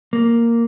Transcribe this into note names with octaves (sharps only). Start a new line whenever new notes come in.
A#3